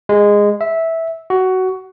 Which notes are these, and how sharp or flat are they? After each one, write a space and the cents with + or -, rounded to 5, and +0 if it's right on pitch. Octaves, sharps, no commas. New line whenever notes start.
G#3 -15
E5 -10
F#4 +15